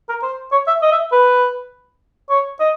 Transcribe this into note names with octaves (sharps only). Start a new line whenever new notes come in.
A#4
C5
C#5
E5
D#5
E5
B4
C#5
D#5